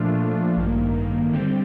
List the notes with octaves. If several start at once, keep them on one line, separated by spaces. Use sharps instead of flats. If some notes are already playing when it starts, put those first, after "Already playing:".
Already playing: A#2 F3 A3 D4 F4
A1 G2 D#3 A#3
D3 G3 C4 G4